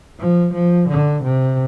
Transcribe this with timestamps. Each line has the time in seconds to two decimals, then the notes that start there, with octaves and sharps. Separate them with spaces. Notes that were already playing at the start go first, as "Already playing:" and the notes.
0.20 F3
0.54 F3
0.89 D3
1.24 C3